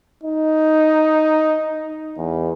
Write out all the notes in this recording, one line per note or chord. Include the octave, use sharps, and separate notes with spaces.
D#4
E2